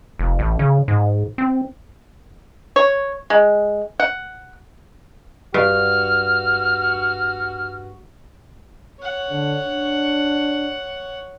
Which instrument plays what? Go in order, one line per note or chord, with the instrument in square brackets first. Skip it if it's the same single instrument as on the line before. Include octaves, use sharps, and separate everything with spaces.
[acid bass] F1
A1
C#3
G#2
C4
[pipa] C#5
G#3
F#5
[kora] G2 [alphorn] F#4 [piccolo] F6
[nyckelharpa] C#5 F#5
[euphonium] D3
D4